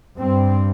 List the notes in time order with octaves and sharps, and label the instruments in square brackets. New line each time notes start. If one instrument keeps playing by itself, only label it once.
[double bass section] G2 C4